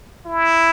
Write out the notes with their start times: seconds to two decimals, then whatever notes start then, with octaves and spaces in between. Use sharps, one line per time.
0.26 E4